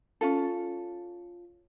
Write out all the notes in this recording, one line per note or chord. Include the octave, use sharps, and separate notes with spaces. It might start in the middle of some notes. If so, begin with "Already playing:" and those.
C#4 F4 A4